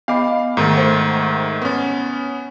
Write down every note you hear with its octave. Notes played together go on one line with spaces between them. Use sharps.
B3 D#5 F5 B5 D6
G#2 D#3 A3
C5
B3 C#4